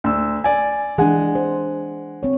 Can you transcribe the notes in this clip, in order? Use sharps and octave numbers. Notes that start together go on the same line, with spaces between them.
D2 E6
D5 G#5
E3 G#3 D4 F#5 G#5
C5
C4 C#5